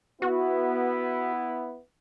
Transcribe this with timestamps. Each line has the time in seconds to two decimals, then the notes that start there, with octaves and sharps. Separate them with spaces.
0.22 B3 E4 F#4